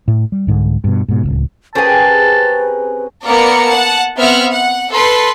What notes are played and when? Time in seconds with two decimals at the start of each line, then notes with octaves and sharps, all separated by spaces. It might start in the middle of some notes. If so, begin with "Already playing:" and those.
0.08 A2
0.32 G3
0.47 C2 G#2 D3
0.84 G2 B2
1.08 G#2 B2
1.23 D1 G1 C#2
1.75 C4 C#4 G4 G#4 A#4 B4 G#5 A5
3.24 A#3 B3 A#4 D5 C#7
3.68 F#5 A5
4.17 B3 C4 E5 F#5 F6
4.50 F#5
4.91 A4 B4 C6